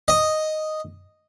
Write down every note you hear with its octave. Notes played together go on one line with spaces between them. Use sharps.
D#5